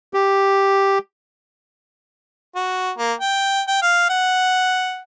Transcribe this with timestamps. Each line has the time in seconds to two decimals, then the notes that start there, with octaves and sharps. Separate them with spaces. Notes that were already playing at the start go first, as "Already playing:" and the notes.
0.14 G4
2.55 F#4
2.98 A#3
3.20 G5
3.68 G5
3.82 F5
4.09 F#5